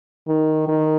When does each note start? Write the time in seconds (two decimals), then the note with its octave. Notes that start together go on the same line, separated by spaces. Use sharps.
0.28 D#3
0.68 D#3